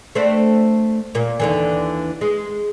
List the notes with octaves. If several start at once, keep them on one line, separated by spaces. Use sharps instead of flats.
A3 C4 D4
A#2 A#3
D#2 D3 E3
G#3